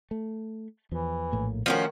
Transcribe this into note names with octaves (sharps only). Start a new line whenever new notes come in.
A3
E2 E3 F3
A#1 A2 A#3
D#3 F3 A3 C#4 F#4